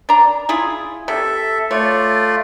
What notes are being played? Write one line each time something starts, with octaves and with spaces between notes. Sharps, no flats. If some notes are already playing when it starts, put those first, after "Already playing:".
D4 A#5
E4 F4 G#4
C3 A4 E5
A3 F4 C#5 D5